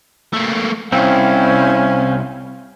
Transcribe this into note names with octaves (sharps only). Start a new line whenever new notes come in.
A3 A#3
C2 C4 C#4 E4 F5